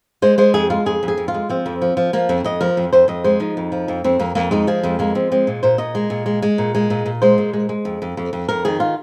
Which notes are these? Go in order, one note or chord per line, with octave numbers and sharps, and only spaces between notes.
G#3 C5
G#3 C5
F2 G#4
G#3 F4
F2 G#4
F2
G#4
F2
F4
G#3
F3 C4
F2
F3
F3
F3 A#3
F2 C4
F2 D#5
F3 A#4
F2
F2 C5
F2 D#5
G#3 C5
F3 D#4
F2
F3
F2
F2 C4
F2 A#3
F2 A#3
G#3 D#4
F3 G#4
F2 G#3
G#3 A#3
F3 C4
G#3 C4
A#2
A#2 C5
A#2 D#5
G#3
A#2
G#3
G#3
A#2
G#3
A#2
A#2
G#3 C5
A#2
G#3
G#3
F2
F2
F2
F2
F2 A#4
D#3 G#4
F4